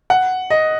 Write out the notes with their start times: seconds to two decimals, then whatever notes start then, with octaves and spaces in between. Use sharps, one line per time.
0.10 F#5
0.50 D#5